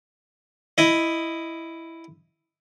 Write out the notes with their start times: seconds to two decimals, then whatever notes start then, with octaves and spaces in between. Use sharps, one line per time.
0.78 E4 D#5